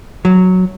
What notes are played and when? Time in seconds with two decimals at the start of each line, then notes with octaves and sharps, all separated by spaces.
0.25 F#3